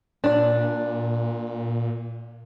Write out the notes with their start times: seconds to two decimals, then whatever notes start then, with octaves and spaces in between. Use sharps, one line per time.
0.24 A#2 D4 D5